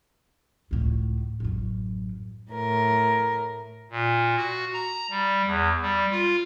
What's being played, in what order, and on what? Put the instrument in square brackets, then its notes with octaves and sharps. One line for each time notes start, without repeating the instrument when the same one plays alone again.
[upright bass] C#2 A2
A1 F#2
[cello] A2 A#4
[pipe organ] A#2
F#4
A#5
G3
E2
G3
F4